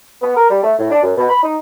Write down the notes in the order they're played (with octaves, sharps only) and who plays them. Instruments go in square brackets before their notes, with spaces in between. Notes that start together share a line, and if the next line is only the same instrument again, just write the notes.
[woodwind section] B3
A#4
G3
A3
A2
D4
F#2
B2
B5
D#4